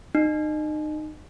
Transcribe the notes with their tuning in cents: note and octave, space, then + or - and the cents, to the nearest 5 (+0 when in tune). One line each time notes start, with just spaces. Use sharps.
D#4 -30